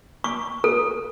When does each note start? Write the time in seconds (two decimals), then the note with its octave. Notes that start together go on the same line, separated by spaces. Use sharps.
0.24 C#6
0.64 A4